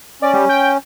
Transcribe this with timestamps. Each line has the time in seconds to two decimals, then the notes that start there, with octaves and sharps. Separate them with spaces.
0.22 C#4 D5
0.34 G3
0.49 G5